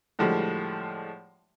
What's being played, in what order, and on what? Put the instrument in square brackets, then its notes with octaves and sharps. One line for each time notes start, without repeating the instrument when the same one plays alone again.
[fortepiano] A2 D3 F3 G3 G#3